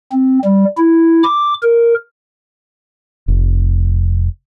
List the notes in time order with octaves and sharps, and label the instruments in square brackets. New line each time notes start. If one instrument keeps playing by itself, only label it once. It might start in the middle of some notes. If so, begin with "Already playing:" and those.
[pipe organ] C4
G3
E4
D6
A#4
[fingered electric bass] F1